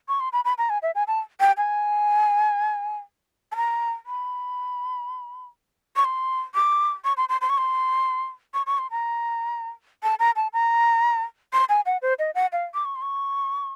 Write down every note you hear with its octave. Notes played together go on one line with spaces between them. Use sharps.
C#6
C6
B5
B5
A#5
G#5
E5
G#5
A5
G5
G#5
A5
A#5
B5
C#6
C6
D6
C#6
C6
C6
C6
C#6
C6
C#6
C#6
C6
A#5
A5
A#5
A5
A#5
C6
G#5
F#5
C5
D#5
F#5
F5
D6
C#6
C6
C#6